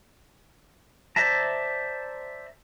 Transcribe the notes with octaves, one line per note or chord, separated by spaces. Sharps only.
C5 D5 E5 A5 A#5